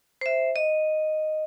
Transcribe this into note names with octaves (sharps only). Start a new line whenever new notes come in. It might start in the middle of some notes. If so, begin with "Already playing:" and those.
C5 E5
D#5